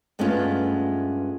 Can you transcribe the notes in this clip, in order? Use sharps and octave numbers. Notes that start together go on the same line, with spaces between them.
G2 G#3 A3 B3 C#4 F4